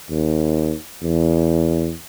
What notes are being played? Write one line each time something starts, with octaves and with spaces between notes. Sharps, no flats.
D#2
E2